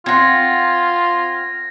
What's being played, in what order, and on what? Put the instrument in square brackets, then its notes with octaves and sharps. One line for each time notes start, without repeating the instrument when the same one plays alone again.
[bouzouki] C4 F#5 [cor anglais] F4 [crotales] G#6 A#6